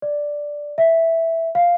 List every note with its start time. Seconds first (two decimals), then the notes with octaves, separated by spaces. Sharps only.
0.02 D5
0.78 E5
1.55 F5